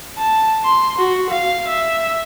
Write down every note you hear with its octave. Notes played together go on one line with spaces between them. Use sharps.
A5
C6
F#4
F5
E5